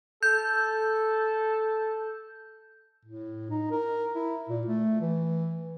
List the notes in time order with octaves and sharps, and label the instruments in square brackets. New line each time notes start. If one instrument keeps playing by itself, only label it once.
[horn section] A4 [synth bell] G6
[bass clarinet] A2
D#4
A#4
E4
A#2
A3
E3